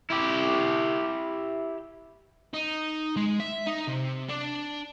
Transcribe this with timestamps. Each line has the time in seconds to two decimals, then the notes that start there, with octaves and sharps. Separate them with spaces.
0.10 E4 G4
2.53 D#4
3.16 G#3
3.40 E5
3.67 D#4
3.88 C3
4.29 D4